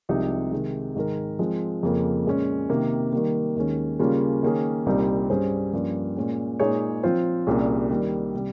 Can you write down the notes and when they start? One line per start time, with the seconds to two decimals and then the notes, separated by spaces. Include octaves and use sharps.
0.09 C2 C3 F3 G#3 D#4
0.52 C3 D#3 G#3
0.95 G#2 D#3 G#3 D#4 A#4
1.39 F3 G#3 C4
1.83 F2 C#3 F3 A#3
2.26 A#2 G#3 C#4
2.69 C3 D#3 A#3
3.13 D#3 G3 A#3
3.56 D#2 D#3 G#3 C#4
3.99 C#3 G3 A#3 C#4 F4
4.43 D#3 A#3 C#4 G#4
4.86 C2 A#2 G3 C4 D#4
5.30 G2 G3 C#4 G#4 C5
5.73 G2 F3 A#3 C#4
6.17 A#2 G#3 C#4
6.59 A#2 G#3 D#4 G#4 C#5
7.03 F3 C4 F4 C5
7.47 C2 A#2 G3 C#4 G#4
7.90 D#3 G3 A#3
8.34 C3 G3